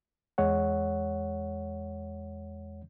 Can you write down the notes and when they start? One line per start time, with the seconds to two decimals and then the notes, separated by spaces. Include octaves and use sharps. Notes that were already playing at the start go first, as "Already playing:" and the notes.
0.38 E2 G#3 C#5 F#5